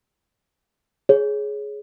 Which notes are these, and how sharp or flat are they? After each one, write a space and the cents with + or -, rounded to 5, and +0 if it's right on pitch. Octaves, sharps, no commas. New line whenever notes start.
G#4 +10 C#5 +0